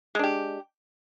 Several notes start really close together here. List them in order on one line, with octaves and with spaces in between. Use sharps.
G#3 D4 G4